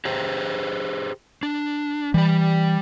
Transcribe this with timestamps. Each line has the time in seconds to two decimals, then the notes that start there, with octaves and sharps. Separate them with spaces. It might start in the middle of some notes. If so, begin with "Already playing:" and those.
0.05 G4 G#4 C5
1.43 D4
2.14 E3 G3 G4